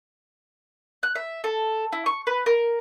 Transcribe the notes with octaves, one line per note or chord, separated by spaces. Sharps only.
F#6
E5
A4
E4
C#6
B4
A#4